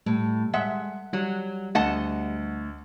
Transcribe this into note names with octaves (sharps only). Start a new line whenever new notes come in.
A2 G3
G#3 E5 F#5
F#3 G3
D2 D#5 F#5 A5